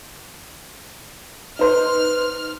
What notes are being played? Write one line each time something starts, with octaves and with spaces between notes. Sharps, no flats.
D#4 B4 C5 F6